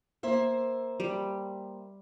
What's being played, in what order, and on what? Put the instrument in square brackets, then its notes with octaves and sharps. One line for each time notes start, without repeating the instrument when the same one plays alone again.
[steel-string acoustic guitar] A#3 C5 E5
[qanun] G3